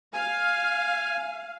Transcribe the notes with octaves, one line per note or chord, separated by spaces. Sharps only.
F5 G#5